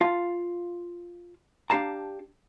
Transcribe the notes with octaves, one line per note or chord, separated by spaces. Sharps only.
F4 F5 A5
D4 G4 F5 A5 A#5